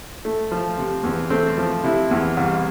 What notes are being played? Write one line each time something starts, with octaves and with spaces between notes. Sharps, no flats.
A3
F3
C3
E2
A3 C4
F3
C3 E4
E2
C2